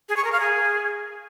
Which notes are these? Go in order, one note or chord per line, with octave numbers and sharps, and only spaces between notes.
G#4
C#6
A#4
F5
G#4